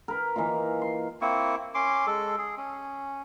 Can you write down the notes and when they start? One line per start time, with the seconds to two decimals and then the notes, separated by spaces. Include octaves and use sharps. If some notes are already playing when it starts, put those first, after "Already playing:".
0.08 A#4 B4
0.36 E3 A#3 D#4 F4
0.82 C6
1.21 A#3 C4 E4 C#6
1.75 C#4 C6 D6
2.07 G#3 A4
2.38 G#4
2.57 C#4